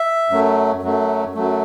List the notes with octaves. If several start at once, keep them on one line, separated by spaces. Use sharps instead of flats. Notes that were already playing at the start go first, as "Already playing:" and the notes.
Already playing: E5
F#2 F#3 A3
F#2 F#3 A3
F#2 F#3 A3